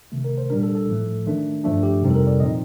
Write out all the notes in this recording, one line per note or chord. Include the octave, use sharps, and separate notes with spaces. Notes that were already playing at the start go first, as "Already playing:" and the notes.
C3 D#3 A3
A#4
C5
A#2 G3 D4 A#4
A4
A4
A2 F3 A3
D#3 A3 D4
G2 F3 A3 D4
G4
F2 C3 G3 C4 D#4
A4
A#4
D5
A#2 F3 C4 D#4 D#5